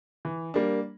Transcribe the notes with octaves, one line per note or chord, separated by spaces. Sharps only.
E3
G3 A#3 D4